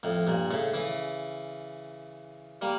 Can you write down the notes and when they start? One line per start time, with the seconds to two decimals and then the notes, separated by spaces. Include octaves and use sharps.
0.03 F2 A2
0.27 G2 A#2
0.51 A2 C#3
0.74 C#3 E3
2.61 G3 A#3